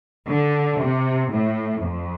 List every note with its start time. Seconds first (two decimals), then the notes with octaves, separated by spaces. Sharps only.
0.27 D3
0.78 C3
1.31 A2
1.84 F2